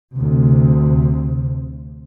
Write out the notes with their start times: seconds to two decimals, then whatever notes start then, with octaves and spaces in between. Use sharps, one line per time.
0.15 D2 C3